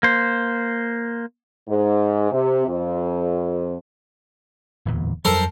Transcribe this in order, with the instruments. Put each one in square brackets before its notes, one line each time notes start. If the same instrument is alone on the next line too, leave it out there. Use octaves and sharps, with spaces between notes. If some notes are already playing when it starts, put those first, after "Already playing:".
[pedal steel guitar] A#3 C5
[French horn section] G#2
C3
F2
[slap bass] D1 E2 A#2
[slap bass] F2 F#3 G3 [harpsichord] A4 A#4 C5